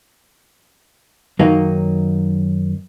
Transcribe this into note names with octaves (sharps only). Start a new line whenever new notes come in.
F#2 D#3 F#3 A#3 D#4